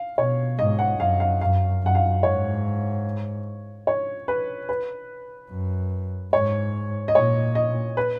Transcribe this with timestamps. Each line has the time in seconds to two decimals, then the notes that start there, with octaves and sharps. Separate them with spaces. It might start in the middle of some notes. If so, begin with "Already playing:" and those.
Already playing: F5
0.17 B2 C#5
0.59 G#2 D#5
0.79 F#5
0.99 F#2 F5
1.20 F5
1.41 F#2 F5
1.82 F#2 F#5
1.95 F5
2.23 G#2 C#5
3.87 C#5
4.28 B4
4.69 B4
5.50 F#2
6.33 G#2 C#5
7.08 D#5
7.15 A#2 C#5
7.55 D#5
7.97 B4